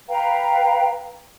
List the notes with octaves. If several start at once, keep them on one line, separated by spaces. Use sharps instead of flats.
B4 F5 G5 A#5